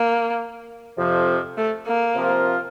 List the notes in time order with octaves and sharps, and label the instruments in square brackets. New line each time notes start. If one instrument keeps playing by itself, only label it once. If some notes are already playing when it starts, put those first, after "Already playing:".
Already playing: [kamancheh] A#3
[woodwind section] F2 C3 F3
[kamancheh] A3
A#3
[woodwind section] C3 F3 C4 F4 A#4